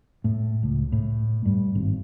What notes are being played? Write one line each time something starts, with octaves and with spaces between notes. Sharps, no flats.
A2
C#2
A2
G2
G#1